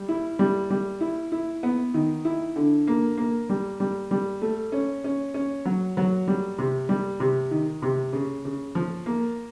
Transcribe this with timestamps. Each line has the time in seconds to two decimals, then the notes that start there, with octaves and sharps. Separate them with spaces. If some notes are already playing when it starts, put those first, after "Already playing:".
Already playing: G3
0.09 E4
0.39 G3
0.70 G3
1.01 E4
1.32 E4
1.63 B3
1.94 D#3
2.25 E4
2.56 D3
2.87 A#3
3.18 A#3
3.49 G3
3.80 G3
4.11 G3
4.42 A3
4.72 C#4
5.04 C#4
5.34 C#4
5.65 F#3
5.97 F#3
6.28 G3
6.58 C3
6.89 G3
7.20 C3
7.51 D#3
7.82 C3
8.13 C#3
8.45 C#3
8.75 F3
9.06 A#3